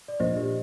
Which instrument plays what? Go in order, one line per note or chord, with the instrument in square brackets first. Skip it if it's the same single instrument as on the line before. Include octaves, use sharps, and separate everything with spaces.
[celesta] D5
[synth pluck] A#2 F3 A#3 D4 [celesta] C5 D#5
[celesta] G4